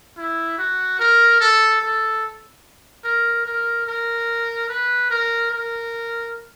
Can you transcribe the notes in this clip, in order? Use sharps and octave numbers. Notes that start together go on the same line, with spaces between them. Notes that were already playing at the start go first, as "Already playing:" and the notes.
E4
F#4
A#4
A4
A4
A#4
A#4
A#4
B4
A#4
A#4